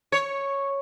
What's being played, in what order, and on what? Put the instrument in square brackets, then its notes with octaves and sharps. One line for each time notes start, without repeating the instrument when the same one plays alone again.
[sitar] C#5